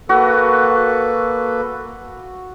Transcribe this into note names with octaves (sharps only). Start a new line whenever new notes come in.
A#3 F#4 A4 B4